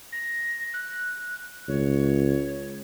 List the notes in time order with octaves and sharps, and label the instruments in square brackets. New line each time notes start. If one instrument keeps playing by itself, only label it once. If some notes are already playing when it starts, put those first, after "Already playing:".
[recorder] A#6
F#6
[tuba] C#2 [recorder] C#5